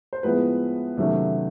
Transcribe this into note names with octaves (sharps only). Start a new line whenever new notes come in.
C5
A2 F3 G#3 B3 B4
C3 D#3 F#3 A3 C#4